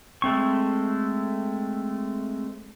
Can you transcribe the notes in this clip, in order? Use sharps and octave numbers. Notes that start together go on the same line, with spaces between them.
G#3 A3 C4 C#6